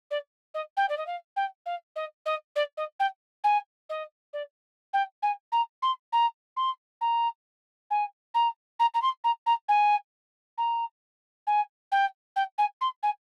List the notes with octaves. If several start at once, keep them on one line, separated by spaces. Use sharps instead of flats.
D5
D#5
G5
D5
D#5
F5
G5
F5
D#5
D#5
D5
D#5
G5
G#5
D#5
D5
G5
G#5
A#5
C6
A#5
C6
A#5
G#5
A#5
A#5
A#5
C6
A#5
A#5
G#5
A#5
G#5
G5
G5
G#5
C6
G#5